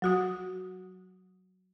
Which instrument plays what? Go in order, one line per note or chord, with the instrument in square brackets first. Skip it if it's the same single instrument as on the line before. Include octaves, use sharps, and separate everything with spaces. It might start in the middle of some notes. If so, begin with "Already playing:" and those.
[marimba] F#3 F#4 D#6